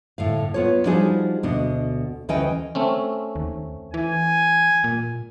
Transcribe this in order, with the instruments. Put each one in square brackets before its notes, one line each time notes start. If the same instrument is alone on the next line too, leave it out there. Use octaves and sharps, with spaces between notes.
[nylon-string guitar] A2 D3 F5
B3 F4 C#5
F3 G3 D4 D#4 F#4 G#4
D2 B2 D4 D#5
D2 E3 C#4 D#5 G5 G#5
[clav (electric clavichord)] A3 C4 C#4
[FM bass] D#2
[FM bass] E3 [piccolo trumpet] G#5
[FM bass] A#2